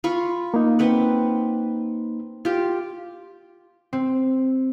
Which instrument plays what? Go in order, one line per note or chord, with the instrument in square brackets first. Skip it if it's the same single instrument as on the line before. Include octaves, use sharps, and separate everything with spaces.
[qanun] F4 B5 C#6
[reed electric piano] A#3 D#4
[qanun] C4 B4 F#5
F4 G4
[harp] C4